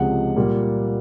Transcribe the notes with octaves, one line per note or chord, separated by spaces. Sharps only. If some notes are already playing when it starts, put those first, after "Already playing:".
Already playing: C#2 C3 F3 G#3 F#5
A#2 G3 A#3